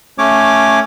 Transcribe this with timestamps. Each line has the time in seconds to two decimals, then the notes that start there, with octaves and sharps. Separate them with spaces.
0.18 A3 C#4 C#5 D6